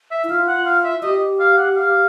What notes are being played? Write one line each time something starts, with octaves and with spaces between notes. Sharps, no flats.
E5
E4
F4 F5
F#5
F5
E5
G4 D#5
F5
F#5
F5